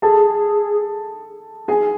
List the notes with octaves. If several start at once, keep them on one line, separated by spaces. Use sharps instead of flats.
G#4 A4 A5
G#4 G#5